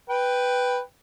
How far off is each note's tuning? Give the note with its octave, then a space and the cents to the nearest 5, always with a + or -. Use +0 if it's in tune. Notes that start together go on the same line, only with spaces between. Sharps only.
B4 +0 G5 +0